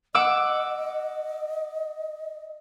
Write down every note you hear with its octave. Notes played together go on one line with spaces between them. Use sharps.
D#5 F#5 D6 E6